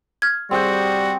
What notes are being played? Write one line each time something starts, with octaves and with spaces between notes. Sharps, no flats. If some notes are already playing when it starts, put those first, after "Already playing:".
F6 G#6
G3 C4 F#4 G#4 G5